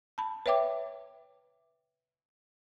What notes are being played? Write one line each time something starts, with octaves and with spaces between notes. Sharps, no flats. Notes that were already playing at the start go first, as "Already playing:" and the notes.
A5 B5
B4 C#5 E5 G5 D6